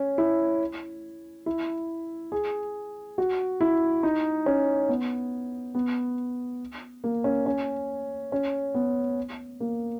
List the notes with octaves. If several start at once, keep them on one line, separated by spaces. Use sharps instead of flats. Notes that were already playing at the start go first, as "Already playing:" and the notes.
Already playing: C#4
E4
E4
G#4
F#4
E4
D#4
C#4
B3
B3
A#3
C#4
C#4
C#4
B3
A#3